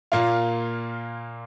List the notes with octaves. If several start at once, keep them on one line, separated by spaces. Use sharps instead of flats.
A#2 A#3 F4